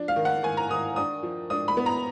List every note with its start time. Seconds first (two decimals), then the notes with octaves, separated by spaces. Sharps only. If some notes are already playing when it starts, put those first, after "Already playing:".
Already playing: F3 D4
0.08 F5
0.16 D#3
0.25 F#5
0.43 D#3 G#5
0.57 A#5
0.69 D#3 D#6
0.96 D4 D#6
1.23 F3
1.50 D4 D#6
1.68 B5
1.77 B3
1.86 A#5